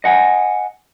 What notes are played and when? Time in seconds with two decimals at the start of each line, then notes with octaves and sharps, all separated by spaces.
0.04 D#5 F#5 G#5